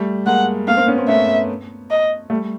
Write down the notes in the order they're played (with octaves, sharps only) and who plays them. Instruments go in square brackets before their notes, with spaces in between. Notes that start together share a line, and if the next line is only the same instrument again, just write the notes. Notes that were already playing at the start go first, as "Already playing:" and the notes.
Already playing: [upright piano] G3 A3
[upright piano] G#3 A#3 [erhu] F#5
[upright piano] A3 B3 [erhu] F5
[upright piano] A#3 C4
B3 C#4
A#3 C4
[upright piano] A3 B3 [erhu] E5
[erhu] D#5
[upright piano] G3 A3